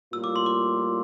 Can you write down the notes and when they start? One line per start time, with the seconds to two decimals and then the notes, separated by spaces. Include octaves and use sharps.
0.12 A2 G3 A#3 F4 E6
0.24 D6
0.36 C6
0.46 D6